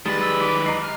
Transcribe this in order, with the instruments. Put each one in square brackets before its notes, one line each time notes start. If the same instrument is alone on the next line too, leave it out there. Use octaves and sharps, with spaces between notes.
[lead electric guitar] D#3 B4 [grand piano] G3 G#3 [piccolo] A6
[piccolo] E6
D6
[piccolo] D#5 [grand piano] A#5 C7
[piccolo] F6